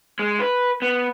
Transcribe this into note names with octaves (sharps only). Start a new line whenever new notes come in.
G#3
B4
B3